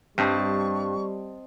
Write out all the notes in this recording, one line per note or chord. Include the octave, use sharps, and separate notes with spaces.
G2 G3 C4 D#5 A5 C#6